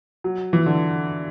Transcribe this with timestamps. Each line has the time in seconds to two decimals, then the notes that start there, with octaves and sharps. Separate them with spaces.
0.24 F#3
0.53 E3
0.66 D3